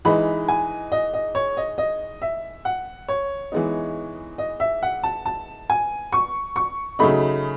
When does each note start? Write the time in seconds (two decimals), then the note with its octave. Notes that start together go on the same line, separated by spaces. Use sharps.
0.05 E3 G#3 D#4 B5
0.48 G#5
0.92 D#5
1.14 D#5
1.35 C#5
1.57 D#5
1.78 D#5
2.22 E5
2.65 F#5
3.08 C#5
3.52 E3 G#3 B3 D#4
4.38 D#5
4.60 E5
4.83 F#5
5.03 A5
5.26 A5
5.70 G#5
6.12 C#6
6.56 C#6
6.99 C#3 F#3 A3 D#4 B5